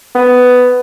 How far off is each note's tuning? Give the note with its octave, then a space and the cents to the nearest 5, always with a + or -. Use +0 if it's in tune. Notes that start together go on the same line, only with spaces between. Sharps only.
B3 +10